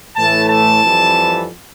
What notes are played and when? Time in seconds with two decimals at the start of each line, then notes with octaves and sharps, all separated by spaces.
0.16 A2 E3 A3 A5
0.49 A5
0.82 F2 E3 G3 C4